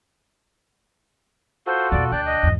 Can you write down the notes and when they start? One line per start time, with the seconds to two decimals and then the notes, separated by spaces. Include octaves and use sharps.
1.67 F4 F#4 A4 C5
1.92 E2 B2 D5
2.12 D2 D4 D5 G5 F#6
2.26 D#5
2.43 E2 G#2